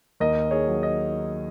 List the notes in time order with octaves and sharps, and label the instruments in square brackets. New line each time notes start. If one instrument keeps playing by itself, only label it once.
[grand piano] D#2 A#4 D#5
G#4 C#5
F#3
D#5